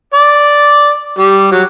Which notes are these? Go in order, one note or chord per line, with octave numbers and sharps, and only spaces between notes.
D5
G3
F#3